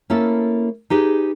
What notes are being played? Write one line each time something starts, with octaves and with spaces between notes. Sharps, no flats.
A#3 C#4 E4 A4
D#4 G4 G#4 B4